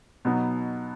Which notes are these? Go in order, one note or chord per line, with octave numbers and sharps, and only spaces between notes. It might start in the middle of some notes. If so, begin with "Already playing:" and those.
B2 F#3 B3 D#4